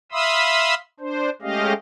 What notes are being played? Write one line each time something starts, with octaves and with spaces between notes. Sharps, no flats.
E5 F5 B5 C6 D#6 E6
D4 C5
G#3 A3 C#4 G4 D#5 F5